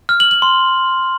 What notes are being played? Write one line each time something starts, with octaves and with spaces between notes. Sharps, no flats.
F6
F#7
F#7
C6